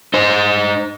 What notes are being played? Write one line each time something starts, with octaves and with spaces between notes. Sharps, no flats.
D#4 C5